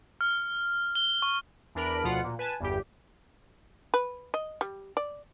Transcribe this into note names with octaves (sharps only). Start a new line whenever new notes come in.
F6
G7
C#6
E2 D4 A#4 B5 D7
D2 B2 F3 F4 F#5
A#2
B4 G#5 A5
G1 E2 G2 G4
B4
D#5
G3
D5